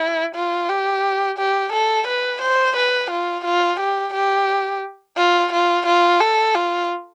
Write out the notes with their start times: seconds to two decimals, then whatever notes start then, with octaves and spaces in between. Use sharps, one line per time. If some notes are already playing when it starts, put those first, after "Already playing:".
Already playing: E4
0.35 F4
0.69 G4
1.38 G4
1.73 A4
2.08 B4
2.41 C5
2.77 B4
3.11 F4
3.45 F4
3.80 G4
4.14 G4
5.17 F4
5.52 F4
5.86 F4
6.21 A4
6.55 F4